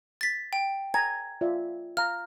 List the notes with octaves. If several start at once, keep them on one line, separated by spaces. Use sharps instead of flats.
A6 B6
G5
G#5 A#5 G#6
F4 D5 E5
F5 A#5 F6